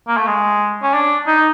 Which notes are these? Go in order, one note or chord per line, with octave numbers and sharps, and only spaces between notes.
A#3
A3
G#3
C#4
D4
D#4